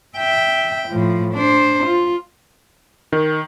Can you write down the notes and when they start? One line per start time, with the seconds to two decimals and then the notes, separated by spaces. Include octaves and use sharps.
0.17 E5 G5
0.89 A2 F3
1.34 D4 C5
1.86 F4
3.12 D#3